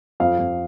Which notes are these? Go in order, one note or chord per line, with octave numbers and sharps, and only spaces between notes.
F2 F5
F2